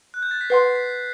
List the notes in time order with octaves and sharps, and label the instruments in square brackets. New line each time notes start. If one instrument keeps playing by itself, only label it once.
[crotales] F#6
G6
A6
B6
[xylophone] B4 F#5 C6 [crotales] C7
[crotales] B6